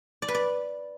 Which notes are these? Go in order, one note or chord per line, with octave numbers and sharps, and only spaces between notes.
D5
B4
D5